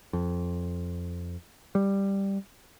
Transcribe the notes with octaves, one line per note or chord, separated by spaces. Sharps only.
F2
G3